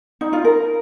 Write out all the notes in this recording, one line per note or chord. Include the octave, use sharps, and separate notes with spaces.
D#4
F4
A#4